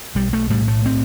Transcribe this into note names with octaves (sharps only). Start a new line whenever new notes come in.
B1 G3
A3
A2 G3
A3
C4